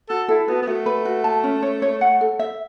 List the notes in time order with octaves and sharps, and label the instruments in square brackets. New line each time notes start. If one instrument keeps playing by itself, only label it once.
[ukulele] F#4 [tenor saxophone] A4
[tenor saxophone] E4 [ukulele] A4
[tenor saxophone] B3 [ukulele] F#4
[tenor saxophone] B3
[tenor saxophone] A3 [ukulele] F#4
[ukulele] B4
F#4
A5
C#4
C#5
C#5
F#5
A4
E5